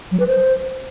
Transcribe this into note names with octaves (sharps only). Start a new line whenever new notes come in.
F#3
B4
C5